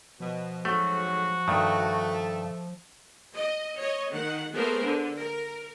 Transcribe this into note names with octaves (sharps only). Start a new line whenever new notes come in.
B2 F3
F2 G#2 F#3 A3 F#4
G2 D#3 A3
D#5
C#5 D#5
D#3 F#5
A3 B3 G#4 A#4 C5
D3
A#4